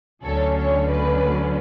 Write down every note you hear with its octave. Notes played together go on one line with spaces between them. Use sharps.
D2 D3 F#3 A3 C#4 A4 C#5
A4 C#5
B4 D5